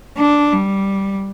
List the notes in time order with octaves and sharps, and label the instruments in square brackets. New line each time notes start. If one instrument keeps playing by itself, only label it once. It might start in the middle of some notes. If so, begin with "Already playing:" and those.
[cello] D4
G3